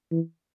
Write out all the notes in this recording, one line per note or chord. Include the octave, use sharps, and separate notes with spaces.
E3